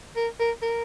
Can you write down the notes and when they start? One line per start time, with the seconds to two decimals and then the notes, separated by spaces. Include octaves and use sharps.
0.16 A#4
0.39 A#4
0.62 A#4